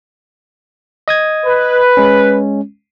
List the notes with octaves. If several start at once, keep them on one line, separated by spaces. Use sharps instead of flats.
D#5 D#6 G#6
B4
G#3 C#4